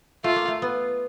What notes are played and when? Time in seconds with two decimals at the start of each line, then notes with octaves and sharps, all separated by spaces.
0.24 A3 F4
0.36 A#3
0.48 A3
0.62 B3